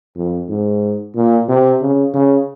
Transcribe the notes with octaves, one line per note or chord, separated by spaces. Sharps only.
F2
G#2
A#2
C3
C#3
C#3